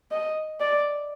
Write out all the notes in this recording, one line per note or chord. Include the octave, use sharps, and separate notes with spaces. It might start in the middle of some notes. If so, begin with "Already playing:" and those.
D#5
D5